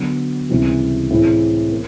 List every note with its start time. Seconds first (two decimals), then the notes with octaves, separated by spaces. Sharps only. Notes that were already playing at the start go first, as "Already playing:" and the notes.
Already playing: D3 F#3 B3
0.49 C#2 C3 E3 G3
1.11 A2 E3 G#3 C4 E4
1.72 A#3